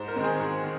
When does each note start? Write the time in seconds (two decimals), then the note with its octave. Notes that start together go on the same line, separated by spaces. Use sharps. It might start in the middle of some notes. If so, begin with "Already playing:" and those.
Already playing: G#2 C5
0.08 A#4
0.16 D#3 G#3 C4
0.24 G#4
0.40 G#2
0.63 D#3